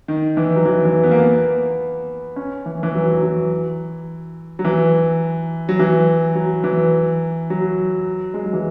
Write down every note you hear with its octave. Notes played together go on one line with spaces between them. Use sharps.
D#3
E3
F#3
E3
E3
B3
A#3
B3
C#4
E3
E3
F#3
F#3
E3
F#3
E3
F#3
E3
F#3
E3
F#3
G#3
F#3
E3